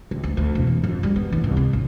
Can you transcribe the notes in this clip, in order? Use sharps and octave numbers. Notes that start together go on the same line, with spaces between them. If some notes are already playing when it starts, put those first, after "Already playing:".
C#2
D2
D2
E1
E2
F2
G3
B3
D#2
C2
C3
A#1